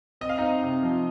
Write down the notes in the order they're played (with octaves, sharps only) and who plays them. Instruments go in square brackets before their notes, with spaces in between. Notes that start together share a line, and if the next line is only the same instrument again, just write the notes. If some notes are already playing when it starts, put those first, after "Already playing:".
[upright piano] C4 [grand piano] D#5
[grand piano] F5
[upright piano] C4 [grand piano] D#4 D#5
[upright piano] C3
F3